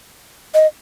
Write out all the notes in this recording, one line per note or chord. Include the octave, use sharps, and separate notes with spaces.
D#5